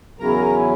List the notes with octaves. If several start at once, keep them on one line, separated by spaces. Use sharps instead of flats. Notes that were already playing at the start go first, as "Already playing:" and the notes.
E2 C#3 F#3 C#4 E4 A#4 A#5